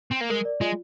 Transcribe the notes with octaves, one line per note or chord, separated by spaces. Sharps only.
C4
A#3
G#3 A#4
D5
G#3 F4